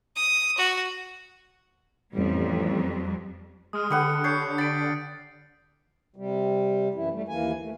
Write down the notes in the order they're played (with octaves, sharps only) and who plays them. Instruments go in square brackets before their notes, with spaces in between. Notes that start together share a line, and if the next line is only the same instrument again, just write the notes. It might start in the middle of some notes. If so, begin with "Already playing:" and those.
[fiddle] D#6
F#4
[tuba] A1 [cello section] F2 G3
[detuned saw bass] G#3 [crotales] D#6 F6
[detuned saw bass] D3 [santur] G4 B4 F#5 [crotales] D#6 C#7
[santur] C#5 [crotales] G6 C7 C#7
[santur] B5 [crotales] A6 D7
[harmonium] C3 G3
F#2 E3 E4
G3 A3
D#2 E3 A#3 G#5
D#2 A3